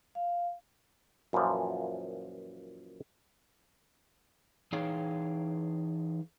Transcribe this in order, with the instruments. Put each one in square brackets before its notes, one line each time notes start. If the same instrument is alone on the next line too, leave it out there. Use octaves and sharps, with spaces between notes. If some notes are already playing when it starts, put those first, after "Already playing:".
[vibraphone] F5
[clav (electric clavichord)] F#2 A#2 E3 F3
[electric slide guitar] E3 D#4 G#4 C#5 F5 G5